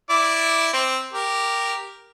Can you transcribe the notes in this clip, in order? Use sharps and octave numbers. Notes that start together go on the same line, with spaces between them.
E4 D5
C4
G4 A#4